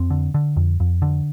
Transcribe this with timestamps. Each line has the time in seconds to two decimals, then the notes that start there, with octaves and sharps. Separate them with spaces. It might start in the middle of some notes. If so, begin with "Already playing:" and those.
Already playing: F2 C4
0.10 D3
0.34 D3
0.57 F2
0.80 F2
1.02 D3